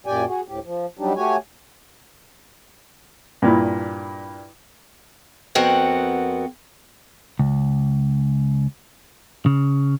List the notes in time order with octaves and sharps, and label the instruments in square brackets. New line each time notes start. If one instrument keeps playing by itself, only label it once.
[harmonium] F#2 A#2 G4 D5 G5 G#5
F#4 G#4
D2 A2 G4
F3
F#3 G3 D4 D#4 G4
A3 F#4 G4 C#5 G#5
[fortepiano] G2 A#2 E4
[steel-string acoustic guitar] F2 B3 C4 F#4 A#4 F#5
[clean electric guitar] C#2
C#3